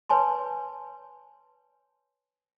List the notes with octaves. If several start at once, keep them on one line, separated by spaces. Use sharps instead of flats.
B4 C#5 G#5 A5 C6